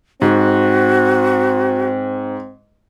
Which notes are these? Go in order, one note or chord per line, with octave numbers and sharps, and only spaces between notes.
G#2 C4 F#4